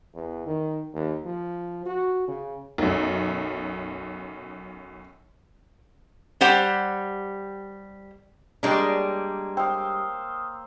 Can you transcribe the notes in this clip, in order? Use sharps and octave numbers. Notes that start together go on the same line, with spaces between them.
E2
D#3
D#2
F3
F#4
C#3
B1 F#2
G3 G4 C5 F#5
G3 G#3 A#3 D4 C#5 G5
C5 F5 G5 D#6 E6